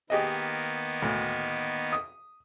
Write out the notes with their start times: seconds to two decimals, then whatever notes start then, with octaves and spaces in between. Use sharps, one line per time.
0.10 D#3 A#3 B3 G4 G#4 D#5
1.02 D2 A2
1.93 D#6